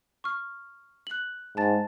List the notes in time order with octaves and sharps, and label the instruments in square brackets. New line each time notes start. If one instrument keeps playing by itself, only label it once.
[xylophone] C#6 F6
F#6 F#7
[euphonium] G#2 [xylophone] A5 A6